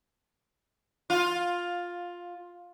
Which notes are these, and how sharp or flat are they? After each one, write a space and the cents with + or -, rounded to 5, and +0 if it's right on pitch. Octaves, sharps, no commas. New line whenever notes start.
F4 +10